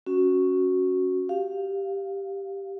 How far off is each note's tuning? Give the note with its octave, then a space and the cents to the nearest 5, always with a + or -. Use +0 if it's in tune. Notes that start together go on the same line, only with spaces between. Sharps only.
C#4 +0 F#4 +0
G4 +0 F5 +0